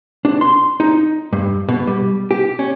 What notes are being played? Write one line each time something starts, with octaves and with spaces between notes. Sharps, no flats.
D4
C6
D#4
G2
B2
G3
G4
C#4